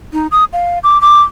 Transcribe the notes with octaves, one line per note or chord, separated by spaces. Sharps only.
D#4
D#6
F5
D6
D6